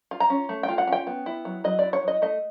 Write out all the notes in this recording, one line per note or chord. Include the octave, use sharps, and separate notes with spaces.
F4
A#5
C#4
A3
G5
F4
F#5
C#4
G5
B3
E4
F#3
F#3 D#5
E4 D5
C#5
F#3 D#5
A3 D#5